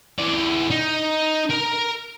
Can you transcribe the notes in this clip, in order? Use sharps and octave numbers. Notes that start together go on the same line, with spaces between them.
E3 D5
D#4
A#4 A#5